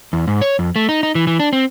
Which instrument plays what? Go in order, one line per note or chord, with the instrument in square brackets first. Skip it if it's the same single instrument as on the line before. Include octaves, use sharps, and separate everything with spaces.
[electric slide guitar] E2
G#2
C#5
F2
A3
D#4
D#4
E3
E3
D4
C4